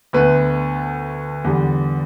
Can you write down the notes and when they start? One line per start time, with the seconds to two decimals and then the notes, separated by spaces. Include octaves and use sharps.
0.13 D2 D3 A3 B3 B4
1.44 E2 D3 G3